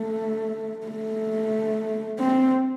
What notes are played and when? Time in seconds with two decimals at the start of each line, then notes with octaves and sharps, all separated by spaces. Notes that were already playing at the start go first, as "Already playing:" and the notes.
Already playing: A3
0.87 A3
2.19 C4